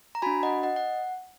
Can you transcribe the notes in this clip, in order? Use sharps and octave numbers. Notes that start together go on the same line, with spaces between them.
A#5
D4 F#4 G#5 B5
D#5 F#5
D#5 F#5
F#5